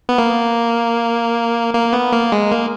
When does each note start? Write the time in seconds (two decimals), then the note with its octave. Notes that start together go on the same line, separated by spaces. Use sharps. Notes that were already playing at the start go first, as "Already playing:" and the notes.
0.09 B3
0.18 A#3
1.74 A#3
1.93 B3
2.12 A#3
2.32 G#3
2.51 A#3